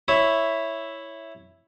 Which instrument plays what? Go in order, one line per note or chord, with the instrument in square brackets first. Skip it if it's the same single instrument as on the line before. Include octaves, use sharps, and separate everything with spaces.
[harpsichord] E4 C#5 E5